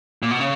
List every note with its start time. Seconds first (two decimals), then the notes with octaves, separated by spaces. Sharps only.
0.22 A#2
0.31 B2
0.40 C#3